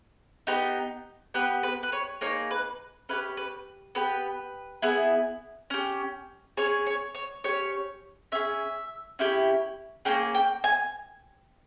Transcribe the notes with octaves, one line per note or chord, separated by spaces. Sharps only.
B3 D#4 G4
B3 G4 B4
B4
B4
C#5
A#3 D#4 G#4 C#5
B4
C#4 E4 G4 B4
B4
B3 G4 B4
B3 E4 G#4
C#4 G4
C#4 G#4 C#5
C#5
C#5
C#4 G4 C#5
C#4 G#4 E5
C#4 E4 G4
A#3 C#4 G#4 G5
G5
G#5